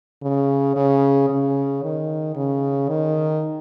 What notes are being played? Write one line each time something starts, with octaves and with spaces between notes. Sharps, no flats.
C#3
C#3
C#3
D#3
C#3
D#3